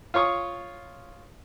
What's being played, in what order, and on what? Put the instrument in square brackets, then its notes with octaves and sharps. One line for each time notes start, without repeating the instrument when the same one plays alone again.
[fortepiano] F4 C#5 C#6 D#6